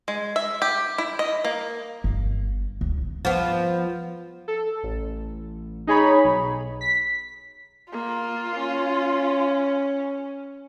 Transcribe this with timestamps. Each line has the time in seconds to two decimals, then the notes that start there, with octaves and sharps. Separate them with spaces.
0.08 G#3
0.36 E5
0.62 G4
0.98 E4
1.19 D#5
1.45 A#3
2.04 G1
2.81 C#2
3.25 F3 B3
4.48 A4
4.83 A1
5.87 D#4 G#4 C#5 B5
6.24 B1
6.81 B6
7.92 A#3 F4
8.56 C#4